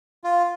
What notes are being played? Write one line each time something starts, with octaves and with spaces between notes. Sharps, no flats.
F4